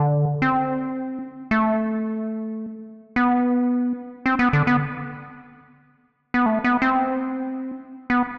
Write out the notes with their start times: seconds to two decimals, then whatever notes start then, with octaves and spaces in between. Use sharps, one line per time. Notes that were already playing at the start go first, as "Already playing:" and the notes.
Already playing: D3
0.42 C4
1.51 A3
3.16 B3
4.26 C4
4.39 B3
4.53 D3
4.67 B3
6.34 B3
6.46 A3
6.64 B3
6.82 C4
8.10 B3